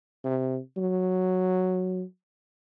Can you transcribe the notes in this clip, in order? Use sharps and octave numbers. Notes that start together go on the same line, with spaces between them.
C3
F#3